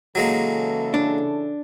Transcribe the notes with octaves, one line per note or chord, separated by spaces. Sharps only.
C#3 E3 F#3 G#3 A#3 A4
D4